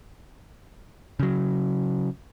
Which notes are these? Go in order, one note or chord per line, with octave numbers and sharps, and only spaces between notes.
C#3 F#3